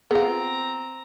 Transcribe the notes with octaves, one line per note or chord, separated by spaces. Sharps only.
B3 C4 F4 G#4 A#5